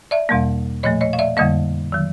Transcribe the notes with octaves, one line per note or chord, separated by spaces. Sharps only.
D5 E5
E2 B2 G3 A#3
A#2 F3 A3 C#5 D#5
C#5 D#5
F5
D5 E5
F2 D3 G3 A#3 D#5 F5
D#3 F#3